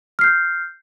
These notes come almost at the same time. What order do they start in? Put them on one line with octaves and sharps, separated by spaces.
F6 C7 G6